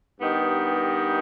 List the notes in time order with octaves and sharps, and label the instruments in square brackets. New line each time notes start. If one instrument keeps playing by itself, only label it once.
[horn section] G2 D#3 B3 D#4 G4